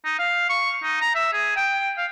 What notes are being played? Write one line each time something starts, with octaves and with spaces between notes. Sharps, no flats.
D#4
F5
C#6
D#4
A#5
E5
G#4
G5
F5